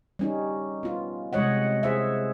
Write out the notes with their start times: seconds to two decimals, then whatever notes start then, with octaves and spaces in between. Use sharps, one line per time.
0.19 G3 C#4 D#4
0.83 B3 F4
1.33 C3 G3 G#3 C#5 D#5 F#5
1.83 G#4 C5 E5